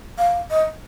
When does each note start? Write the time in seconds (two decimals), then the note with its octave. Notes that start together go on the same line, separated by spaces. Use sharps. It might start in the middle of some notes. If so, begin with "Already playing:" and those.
0.18 F5
0.50 D#5